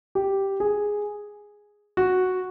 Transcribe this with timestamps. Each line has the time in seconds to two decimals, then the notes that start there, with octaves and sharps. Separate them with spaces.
0.15 G4
0.60 G#4
1.97 F#4